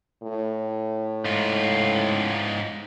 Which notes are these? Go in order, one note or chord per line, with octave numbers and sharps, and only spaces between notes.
A2
G#2 F4